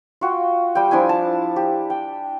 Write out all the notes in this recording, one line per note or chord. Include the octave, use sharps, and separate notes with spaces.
F4 F#4 G5
G3 G5
F3 D4 E4 G#5
A5
G4
G5